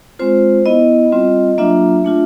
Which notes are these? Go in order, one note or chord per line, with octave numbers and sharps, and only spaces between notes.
G#3 C4 F4 C5
B3 E4 D#5
G3 C4 F4
F#3 A#3 D4 F4 E5
A3 D4 F4